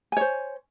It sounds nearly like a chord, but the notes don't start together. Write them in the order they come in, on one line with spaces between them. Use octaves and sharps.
G#5 C#5 C5